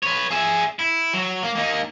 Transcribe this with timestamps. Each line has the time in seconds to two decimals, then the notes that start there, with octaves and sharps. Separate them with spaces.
0.03 B4 C#5
0.31 G#4 E5
0.79 E4
1.14 F#3
1.43 A#3
1.55 A#3 D#4